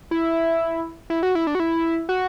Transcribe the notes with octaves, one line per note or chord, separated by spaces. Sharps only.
E4
E4
F#4
E4
D4
F#4
E4
F#4